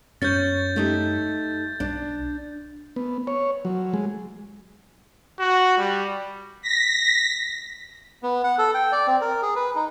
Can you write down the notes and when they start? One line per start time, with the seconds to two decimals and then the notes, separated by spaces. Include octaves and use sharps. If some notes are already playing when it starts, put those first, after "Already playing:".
0.22 F#2 C#4 C#5 G6 A6
0.76 A3 D#4 G4
1.80 B1 D4
2.96 B3
3.27 C#5
3.65 F#3
3.94 G#3
5.40 F#4
5.78 G3
6.62 A#6 B6
8.23 B3
8.44 F#5
8.58 A4
8.74 G5
8.92 D5
9.07 C4
9.21 A#4
9.42 G#4
9.56 B4
9.75 D#4